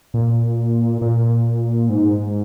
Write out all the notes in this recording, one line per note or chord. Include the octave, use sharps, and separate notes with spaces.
A#2
A#2
G#2